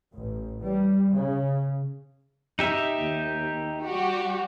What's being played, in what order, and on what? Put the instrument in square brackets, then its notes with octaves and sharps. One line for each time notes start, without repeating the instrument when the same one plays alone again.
[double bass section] A1
G3
C#3
[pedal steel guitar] D#4 G4 E5
[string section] D#2
G3 F#4 G4